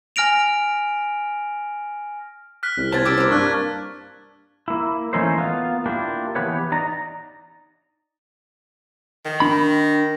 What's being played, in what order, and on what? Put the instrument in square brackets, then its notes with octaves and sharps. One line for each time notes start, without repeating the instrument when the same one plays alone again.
[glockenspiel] G#5 F6 A#6 D7 F7
[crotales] F6 F#6 B6
[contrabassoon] C2
[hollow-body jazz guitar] C4 C5 A5 [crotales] G#6 A6 B6
[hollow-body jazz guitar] C#4 G4 [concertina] D6 E6
[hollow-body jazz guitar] A#4 C5
[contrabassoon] G2 [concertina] A#3 D4 [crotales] C#6 F6 F#6
[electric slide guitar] A#3 E4
E3 A3 C#4 D#4 E4 C5
A#3 B3 F4 F5
A#3 D4 E4 F4 G4
E3 F3 B3 G4 B4 C#5
D#4 D5 A#5
[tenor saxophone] D#3
[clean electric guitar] D4 B5